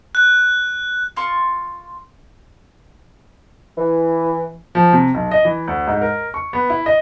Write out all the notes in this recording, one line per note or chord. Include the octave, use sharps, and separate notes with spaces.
F#6
F4 C6 C#6
E3
F3
C3
B1
D#5
E3
D2
G#2
A#4
C#6
B3
E4
D#5